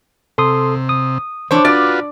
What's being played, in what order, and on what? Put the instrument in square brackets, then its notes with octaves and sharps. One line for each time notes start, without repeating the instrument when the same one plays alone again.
[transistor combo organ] C3 [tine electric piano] A4 C6 D#6
[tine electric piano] D#6
[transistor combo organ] E3 [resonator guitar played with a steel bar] D4 C#5 [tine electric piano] C5
[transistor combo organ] F4 F#4 B4 [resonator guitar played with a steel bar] D5 [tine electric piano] A6